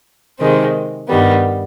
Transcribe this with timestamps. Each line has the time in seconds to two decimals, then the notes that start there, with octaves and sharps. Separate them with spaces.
0.41 C3 D#3 G#3 C4
1.08 G2 D#3 G3 B3